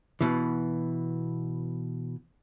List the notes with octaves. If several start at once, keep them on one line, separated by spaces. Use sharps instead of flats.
B2 E3